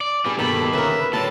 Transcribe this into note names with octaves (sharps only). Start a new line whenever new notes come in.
D5
G3 F#4 G#4 B4
G2 B2 D#3 A#3 B3 A4 B5
C#3 A#4 B4 E5
A2 D3 F#3 A5